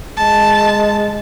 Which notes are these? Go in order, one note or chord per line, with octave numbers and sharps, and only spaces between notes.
G#3 A5